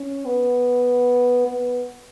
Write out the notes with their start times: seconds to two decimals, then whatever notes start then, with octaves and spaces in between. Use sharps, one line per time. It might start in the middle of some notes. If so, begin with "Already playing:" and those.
Already playing: C#4
0.25 B3
1.47 B3